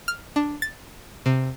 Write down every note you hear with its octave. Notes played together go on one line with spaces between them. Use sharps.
F6
D4
A6
C3